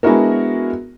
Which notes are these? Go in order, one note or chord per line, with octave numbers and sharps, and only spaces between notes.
G#3 B3 D4 E4 F#4 A#4